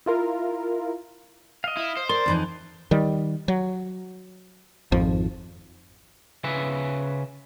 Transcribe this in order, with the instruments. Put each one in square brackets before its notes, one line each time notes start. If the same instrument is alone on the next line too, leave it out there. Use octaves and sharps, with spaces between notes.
[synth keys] E4 F4 A#4
[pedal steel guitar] D#5 F5
[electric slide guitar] E4
C5
[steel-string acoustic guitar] A#4 [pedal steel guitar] D5 C6
[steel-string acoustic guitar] F2 E3 D#4
[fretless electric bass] D#3 G3
F#3
G#1 F2 F3
[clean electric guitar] C#3 C#4 B4 E5